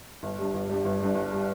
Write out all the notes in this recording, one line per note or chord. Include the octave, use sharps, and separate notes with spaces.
G1
G2 G3
G1
G2 G3
G1
G2 G3
G1
G3